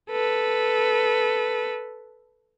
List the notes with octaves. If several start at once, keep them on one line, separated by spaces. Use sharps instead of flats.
A4 B4